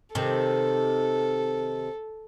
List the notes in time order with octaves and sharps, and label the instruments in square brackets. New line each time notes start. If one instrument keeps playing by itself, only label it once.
[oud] C3 D#3 [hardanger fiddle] A4